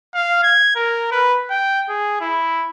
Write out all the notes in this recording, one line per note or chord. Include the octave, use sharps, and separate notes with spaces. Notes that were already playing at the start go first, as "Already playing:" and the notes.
F5
G#6
A#4
B4
G5
G#4
E4